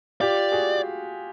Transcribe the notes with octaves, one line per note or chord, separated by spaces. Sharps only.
F4 G4 D5
F#4 G#4